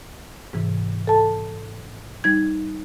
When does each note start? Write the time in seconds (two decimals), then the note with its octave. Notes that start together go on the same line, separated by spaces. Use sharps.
0.53 G#2 C3 E3
1.07 A4 A5
2.24 G3 D#4 G#6